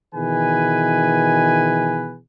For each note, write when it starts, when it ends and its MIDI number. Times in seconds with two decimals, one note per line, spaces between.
0.14 2.16 47
0.14 2.16 51
0.14 2.16 52
0.14 2.16 68
0.14 2.16 71
0.14 2.16 80